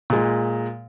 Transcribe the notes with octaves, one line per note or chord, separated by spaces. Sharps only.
A#2 G#3